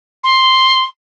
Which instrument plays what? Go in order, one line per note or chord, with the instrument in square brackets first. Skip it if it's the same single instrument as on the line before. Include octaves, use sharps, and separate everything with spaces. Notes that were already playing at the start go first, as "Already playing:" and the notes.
[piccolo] C6